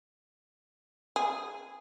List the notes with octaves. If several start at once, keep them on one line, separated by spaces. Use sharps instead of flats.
G#4